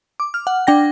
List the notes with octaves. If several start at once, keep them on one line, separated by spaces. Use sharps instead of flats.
D6
F6
F#5
D4 G5 A#6